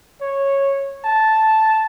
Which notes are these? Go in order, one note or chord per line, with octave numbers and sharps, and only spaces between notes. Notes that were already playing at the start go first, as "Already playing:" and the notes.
C#5
A5